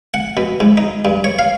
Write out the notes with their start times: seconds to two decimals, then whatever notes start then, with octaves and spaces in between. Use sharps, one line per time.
0.14 F#5
0.37 B2
0.60 G#2
0.77 D#4
1.05 G2
1.24 C#5
1.39 F5